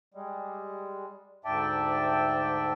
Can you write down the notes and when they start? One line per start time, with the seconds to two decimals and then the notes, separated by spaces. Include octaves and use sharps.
0.14 G3 G#3
1.45 D2 G#2 D5 E5 G5 A5